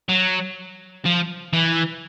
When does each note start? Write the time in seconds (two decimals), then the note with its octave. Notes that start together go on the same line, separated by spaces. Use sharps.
0.09 F#3
1.05 F3
1.53 E3